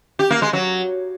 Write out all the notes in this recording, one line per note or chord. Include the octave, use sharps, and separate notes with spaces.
G4
A#3
G#3
F#3